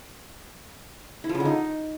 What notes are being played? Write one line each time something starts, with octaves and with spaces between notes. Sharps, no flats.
E4
F3
C#3
D3
D#4